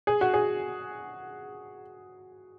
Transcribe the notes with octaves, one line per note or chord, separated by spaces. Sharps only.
G#4
F#4
G#4